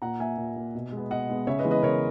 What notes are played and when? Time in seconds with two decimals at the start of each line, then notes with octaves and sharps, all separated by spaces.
0.02 A#2 F#5 A#5
0.20 A#3 E5 G#5
0.38 A#2
0.56 A#3
0.75 B2
0.92 G#3 B3
1.10 B2 D#5 F#5
1.29 G#3 B3
1.47 C#3 C#5 E5
1.59 B4 D#5
1.65 E3 G#3 B3
1.71 B4 D#5
1.83 C#3 A#4 C#5